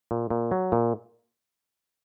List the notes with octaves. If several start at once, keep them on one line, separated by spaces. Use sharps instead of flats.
A#2
A#2
F#3
A#2